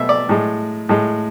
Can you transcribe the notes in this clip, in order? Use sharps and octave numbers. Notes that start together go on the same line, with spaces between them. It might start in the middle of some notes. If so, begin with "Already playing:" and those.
Already playing: B2 A3 E5
D5
A2 G#3
A2 G#3